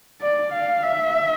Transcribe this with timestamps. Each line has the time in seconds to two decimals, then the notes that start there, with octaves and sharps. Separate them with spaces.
0.21 D5
0.53 F5
0.83 E5